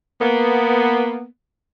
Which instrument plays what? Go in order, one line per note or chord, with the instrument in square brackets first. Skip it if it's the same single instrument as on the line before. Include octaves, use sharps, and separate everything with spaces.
[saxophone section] A#3 B3